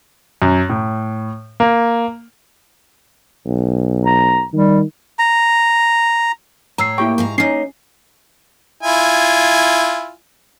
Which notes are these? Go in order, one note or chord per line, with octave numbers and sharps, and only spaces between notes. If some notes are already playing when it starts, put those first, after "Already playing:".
F#2
A2
A#3
B1
A#5
D#3 G3
A#5
A2 C#5 A#5 E6 C7
A#3 E4 G4 G5 C#6
G#2 F5 A#5
A#3 C#4 D#4 C#5 C7
E4 F4 G#5